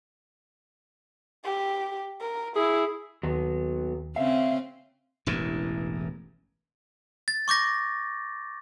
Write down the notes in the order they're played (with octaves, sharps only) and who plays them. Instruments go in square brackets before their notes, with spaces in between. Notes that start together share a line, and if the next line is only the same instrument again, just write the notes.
[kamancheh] G4
A#4
[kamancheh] E4 [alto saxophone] G#4
[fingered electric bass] D#2 [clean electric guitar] F#3 B3
[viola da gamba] C#3 C4 C#4 [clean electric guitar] E5 F5
[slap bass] E1 A1 G2 E3
[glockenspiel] A6
C#6 D6 G6 A#6